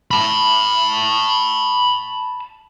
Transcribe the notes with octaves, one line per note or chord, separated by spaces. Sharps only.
A5 B5